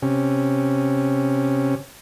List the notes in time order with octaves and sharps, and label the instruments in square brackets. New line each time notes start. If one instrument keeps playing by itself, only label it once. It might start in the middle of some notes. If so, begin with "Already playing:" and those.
[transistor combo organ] C3 C#4